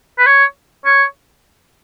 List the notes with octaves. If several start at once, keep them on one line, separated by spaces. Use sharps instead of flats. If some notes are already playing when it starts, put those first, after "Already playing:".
B4
C#5
C#5